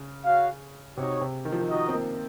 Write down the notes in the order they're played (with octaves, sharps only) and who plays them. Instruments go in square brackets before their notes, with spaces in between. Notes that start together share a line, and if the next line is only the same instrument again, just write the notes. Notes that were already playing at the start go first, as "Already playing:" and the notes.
Already playing: [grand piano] C#3
[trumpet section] F#4 C#5 F5
[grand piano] C3 [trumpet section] D#4 F#4 C#5
[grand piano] C3
D#3
F3
D#3
[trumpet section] D#4 F#4 A#4 D#5
[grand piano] C4
A#3